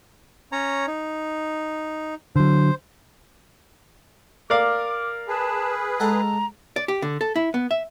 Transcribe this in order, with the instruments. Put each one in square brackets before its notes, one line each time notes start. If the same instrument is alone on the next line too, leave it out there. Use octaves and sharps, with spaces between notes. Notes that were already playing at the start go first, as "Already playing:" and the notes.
[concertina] C#4 C#5 A#5
D#4
[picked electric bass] D3 F#3 [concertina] C5
[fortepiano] A#4 D5 F5 [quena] D6
[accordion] G#4 B4 [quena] A5
[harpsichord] G#3 A4 F#5 [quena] A#5
[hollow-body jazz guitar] D5
G4
D3
A4
E4
B3
E5